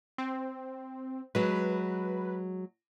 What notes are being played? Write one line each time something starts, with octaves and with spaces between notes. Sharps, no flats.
C4
F#3 G#3 B4